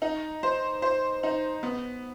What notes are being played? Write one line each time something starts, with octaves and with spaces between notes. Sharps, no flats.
D#4
C5
C5
D#4
B3